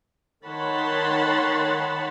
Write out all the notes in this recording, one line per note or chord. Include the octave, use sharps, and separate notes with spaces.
D#3 C#5 F#5 A5 B5 C6